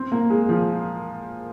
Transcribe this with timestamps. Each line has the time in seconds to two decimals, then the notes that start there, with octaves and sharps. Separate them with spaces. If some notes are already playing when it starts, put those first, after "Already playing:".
Already playing: C4
0.12 A#3
0.30 G#3
0.49 F3